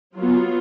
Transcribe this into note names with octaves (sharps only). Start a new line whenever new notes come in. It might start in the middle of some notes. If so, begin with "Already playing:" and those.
F#3 B3 F4